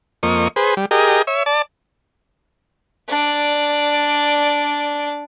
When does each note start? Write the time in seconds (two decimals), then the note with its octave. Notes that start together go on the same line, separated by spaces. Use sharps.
0.23 F2 A#3 D#5 C#6
0.56 G#4 B4 C5
0.77 G3
0.91 G4 G#4 A#4 D#5
1.27 C#5 E5
1.46 D5 A5
3.09 D4 D5